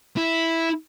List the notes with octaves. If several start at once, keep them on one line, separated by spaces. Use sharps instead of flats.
E4